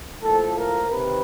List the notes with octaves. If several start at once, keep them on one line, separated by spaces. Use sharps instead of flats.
A2 F3 A#3 A4
A#4
C3 D#3 B4